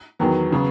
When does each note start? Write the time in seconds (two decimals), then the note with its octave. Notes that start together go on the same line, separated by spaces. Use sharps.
0.19 E2 D#3 F#3 B3
0.52 C#3 F#3 B3